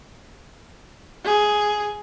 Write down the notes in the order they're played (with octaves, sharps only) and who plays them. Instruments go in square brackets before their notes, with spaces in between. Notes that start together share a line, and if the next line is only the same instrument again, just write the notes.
[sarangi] G#4